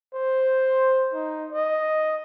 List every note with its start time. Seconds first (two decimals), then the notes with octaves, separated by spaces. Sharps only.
0.13 C5
1.13 D#4
1.52 D#5